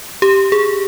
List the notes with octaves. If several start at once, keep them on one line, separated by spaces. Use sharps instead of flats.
G4
G#4